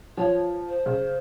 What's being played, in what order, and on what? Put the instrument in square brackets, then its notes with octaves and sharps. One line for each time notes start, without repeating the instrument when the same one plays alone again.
[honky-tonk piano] F3 [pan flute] C#5
[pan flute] C5
[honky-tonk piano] C#3